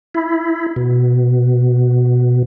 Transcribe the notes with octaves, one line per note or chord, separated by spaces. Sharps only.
E4
B2